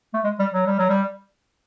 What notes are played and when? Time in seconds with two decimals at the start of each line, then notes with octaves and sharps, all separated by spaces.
0.13 A3
0.24 G#3
0.39 G3
0.53 F#3
0.66 G3
0.78 F#3
0.89 G3